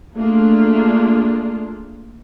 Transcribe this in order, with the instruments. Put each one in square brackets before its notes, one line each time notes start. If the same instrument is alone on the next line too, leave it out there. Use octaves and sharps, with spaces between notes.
[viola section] A3 A#3 D4 F4 G#4